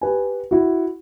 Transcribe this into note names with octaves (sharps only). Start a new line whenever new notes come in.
G4 B4 G#5
E4 F#4